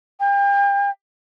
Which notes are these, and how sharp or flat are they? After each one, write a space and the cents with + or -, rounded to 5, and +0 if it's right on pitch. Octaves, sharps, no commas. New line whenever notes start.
G5 +35